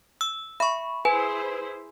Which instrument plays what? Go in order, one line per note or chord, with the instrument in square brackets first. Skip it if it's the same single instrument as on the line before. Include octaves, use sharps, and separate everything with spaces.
[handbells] E6
[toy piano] E5 [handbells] B5 C#6
[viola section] E4 G#4 C5 [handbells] B4 [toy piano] G#5